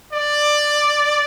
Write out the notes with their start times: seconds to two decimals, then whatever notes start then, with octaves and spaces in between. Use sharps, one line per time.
0.13 D5